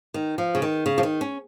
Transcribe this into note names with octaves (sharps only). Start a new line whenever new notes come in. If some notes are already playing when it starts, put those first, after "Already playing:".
D#3
F3
C#3
D#3
C#3
F3
D#3
C#4